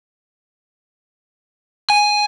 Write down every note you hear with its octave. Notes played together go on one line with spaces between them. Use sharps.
G#5